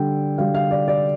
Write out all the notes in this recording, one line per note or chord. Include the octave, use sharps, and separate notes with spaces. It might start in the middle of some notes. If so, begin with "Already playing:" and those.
Already playing: D3 G3 G5
D3 G3 F5
F5
D5
D5